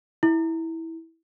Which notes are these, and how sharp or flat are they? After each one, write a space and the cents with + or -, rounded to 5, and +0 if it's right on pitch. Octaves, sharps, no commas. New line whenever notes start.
E4 -15